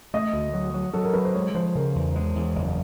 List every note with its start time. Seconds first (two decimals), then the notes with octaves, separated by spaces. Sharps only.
0.14 A3 D#5
0.33 D2
0.54 F#3
0.74 F#3
0.93 F#3 A4
1.03 A#4
1.14 F#3 B4
1.25 C5
1.34 G#3 C#5
1.55 F3 C5
1.75 C#3 A#4
1.95 E2
2.15 G#3
2.36 E2
2.56 F#1